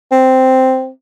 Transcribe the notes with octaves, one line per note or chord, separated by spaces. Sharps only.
C4